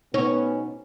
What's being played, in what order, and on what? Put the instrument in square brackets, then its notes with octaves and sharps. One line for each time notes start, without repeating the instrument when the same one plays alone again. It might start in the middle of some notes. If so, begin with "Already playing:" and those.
[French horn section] B2 B3 [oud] C#4 [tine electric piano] D#4